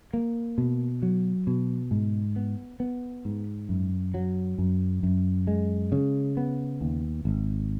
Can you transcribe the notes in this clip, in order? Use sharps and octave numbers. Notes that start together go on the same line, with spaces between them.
A#3
B2
F#3
B2
G#2
B3
B3
G#2
F#2
F#3
F#2
F#2
G#3
C#3
B3
D#2
G#1